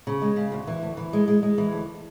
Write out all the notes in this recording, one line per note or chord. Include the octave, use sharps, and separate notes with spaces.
C#3
G#3
C#3
D2
E3
D2
E3
G#3
G#3
G#3
E3
D2